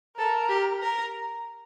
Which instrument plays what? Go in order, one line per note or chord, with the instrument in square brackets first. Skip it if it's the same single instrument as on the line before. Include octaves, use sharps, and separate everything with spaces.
[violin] A4 [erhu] A#4
[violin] G4
A#4